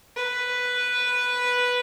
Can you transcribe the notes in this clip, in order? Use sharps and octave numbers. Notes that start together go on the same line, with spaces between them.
B4